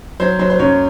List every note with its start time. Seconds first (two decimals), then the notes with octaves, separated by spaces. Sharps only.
0.20 F#3 C5
0.39 F#3 C5
0.50 C5
0.59 F#2 C#5